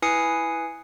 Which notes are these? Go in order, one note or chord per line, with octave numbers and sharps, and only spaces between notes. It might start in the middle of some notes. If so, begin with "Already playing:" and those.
E4 B4 G#5 D#6 C7 C#7